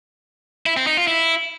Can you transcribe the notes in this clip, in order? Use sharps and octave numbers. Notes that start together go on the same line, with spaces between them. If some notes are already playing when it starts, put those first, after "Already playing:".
E4
C4
D#4
F4
E4